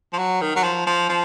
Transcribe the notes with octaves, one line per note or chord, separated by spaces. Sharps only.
F3
F#3
D#3
F#3
F3
F3
F3